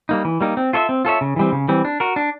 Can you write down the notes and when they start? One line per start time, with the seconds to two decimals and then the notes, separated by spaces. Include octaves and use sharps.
0.09 G3 A#3 D#4
0.25 E3
0.41 G3 A#3 D#4
0.57 C4
0.73 F4 A4 C#5 E5
0.89 C4
1.05 F4 A4 C#5 E5
1.21 C#3
1.36 E3 G3 C4
1.53 C#3
1.68 E3 G3 C4
1.85 D4
2.00 F#4 A#4
2.16 D4